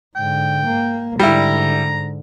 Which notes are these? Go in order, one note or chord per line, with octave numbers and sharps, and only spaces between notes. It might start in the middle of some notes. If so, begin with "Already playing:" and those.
G#2 D3 G5
A#3
G#2 D3 G3 E4 A#5